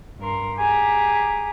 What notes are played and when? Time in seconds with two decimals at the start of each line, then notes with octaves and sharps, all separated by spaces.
0.19 G2 A#4 C6
0.58 G4 G#4 G#5 A#5 D6